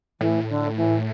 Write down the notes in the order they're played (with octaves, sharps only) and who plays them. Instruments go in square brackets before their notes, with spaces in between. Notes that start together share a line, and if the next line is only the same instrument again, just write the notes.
[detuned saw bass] A2 [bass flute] E3
[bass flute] D3
E3